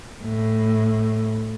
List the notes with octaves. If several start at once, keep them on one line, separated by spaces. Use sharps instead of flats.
A2